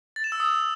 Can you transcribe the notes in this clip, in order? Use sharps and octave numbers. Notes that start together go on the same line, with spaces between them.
A6
E7
E6
D#6